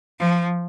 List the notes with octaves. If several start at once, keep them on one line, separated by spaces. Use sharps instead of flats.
F3